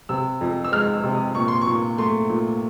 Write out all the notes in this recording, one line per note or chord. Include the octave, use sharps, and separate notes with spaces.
C3 E6
F2
E6
G#3 F6
E6
C3
D#6
A#2 C#6
C6
C#6
A#2
A3 C6
A#2